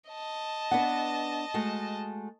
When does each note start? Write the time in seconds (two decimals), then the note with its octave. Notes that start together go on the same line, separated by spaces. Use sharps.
0.10 D#5 A5
0.71 B3 D4 F#5
1.54 G#3 A3 F#4